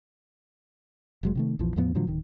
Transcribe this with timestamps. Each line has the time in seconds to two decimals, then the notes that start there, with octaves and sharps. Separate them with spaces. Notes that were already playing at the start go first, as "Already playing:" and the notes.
1.23 F1 F#3 G#3
1.35 C3 D#3 A3
1.59 A#1 E2 E3 F3
1.76 E2 A2 F3 B3
1.95 A2 D3 F3 F#3
2.07 D1 D#3